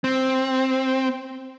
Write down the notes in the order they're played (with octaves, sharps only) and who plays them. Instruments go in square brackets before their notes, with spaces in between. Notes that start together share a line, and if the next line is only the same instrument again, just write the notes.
[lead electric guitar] C4